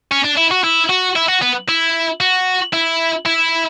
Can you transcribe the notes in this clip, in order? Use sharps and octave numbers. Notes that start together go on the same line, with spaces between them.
C#4
D4
E4
F#4
E4
F#4
E4
F#4
B3
E4
F#4
E4
E4